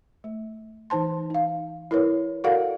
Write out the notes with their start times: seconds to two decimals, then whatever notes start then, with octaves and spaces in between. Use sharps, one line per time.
0.24 A3
0.90 E3 D#4 C5 A5 C6
1.30 D#4 F5
1.91 E4 A#4 B4 C#5
2.44 F#4 A4 A#4 D5 F5 F#5